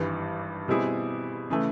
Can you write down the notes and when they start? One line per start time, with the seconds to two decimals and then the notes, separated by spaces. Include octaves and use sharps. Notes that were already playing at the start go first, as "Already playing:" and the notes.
Already playing: G#1 G2 E3 G3
0.68 B2 G3 C4 E4 G#4
1.50 C#3 E3 A3